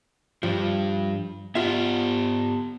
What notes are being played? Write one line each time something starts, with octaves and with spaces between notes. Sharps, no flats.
G2 F3 G3
B3 F4 G4 E5 F#5